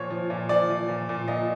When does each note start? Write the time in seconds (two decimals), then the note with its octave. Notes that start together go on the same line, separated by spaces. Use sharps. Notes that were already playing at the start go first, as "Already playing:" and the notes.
Already playing: A#2 F3 C#5
0.10 F3
0.30 A#2
0.49 F3 D5
0.69 F3
0.88 A#2
1.09 A#2
1.28 A#2 D#5